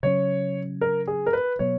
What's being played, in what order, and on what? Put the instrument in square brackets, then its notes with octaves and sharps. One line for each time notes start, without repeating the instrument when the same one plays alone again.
[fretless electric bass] C#3 F#3 C#4 [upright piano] C#5
[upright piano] A#4
G#4
A#4
B4
[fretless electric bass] B2 F#3 B3 [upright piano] C#5